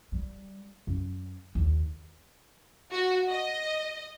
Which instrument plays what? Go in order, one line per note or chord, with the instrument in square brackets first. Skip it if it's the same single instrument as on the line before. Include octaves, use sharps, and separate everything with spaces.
[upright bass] G3
F#2
D#2
[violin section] F#4
D#5